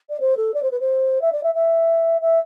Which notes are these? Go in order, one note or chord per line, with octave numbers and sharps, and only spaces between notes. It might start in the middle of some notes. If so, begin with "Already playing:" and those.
D5
C5
A4
D5
C5
B4
C5
E5
D5
E5
E5
E5